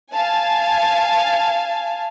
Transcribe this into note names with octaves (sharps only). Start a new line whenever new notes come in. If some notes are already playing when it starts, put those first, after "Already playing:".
F5 G#5 A5